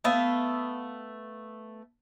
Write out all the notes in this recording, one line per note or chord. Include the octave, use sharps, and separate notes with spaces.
A3 B3 E5 F5